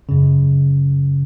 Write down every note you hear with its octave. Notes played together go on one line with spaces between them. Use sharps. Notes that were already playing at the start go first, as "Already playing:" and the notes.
F#2 C#3